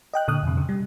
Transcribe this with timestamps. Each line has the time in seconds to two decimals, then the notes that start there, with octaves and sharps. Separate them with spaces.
0.14 D#5 G5 F#6
0.28 A#2 D3 D#6 F#6
0.43 F2 C3
0.57 C#3
0.69 G3